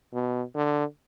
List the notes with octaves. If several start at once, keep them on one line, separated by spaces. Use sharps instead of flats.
B2
D3